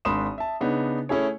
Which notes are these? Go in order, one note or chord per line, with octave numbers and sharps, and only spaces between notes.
G#1 D4 B5 C6 D#6 E7
E5 A5
C#3 B3 D4 D#4
A3 C#4 E4 G#4 C#5